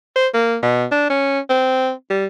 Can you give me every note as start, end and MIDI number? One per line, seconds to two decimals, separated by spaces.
0.16 0.28 72
0.34 0.56 58
0.62 0.85 47
0.91 1.05 62
1.10 1.39 61
1.50 1.91 60
2.10 2.26 55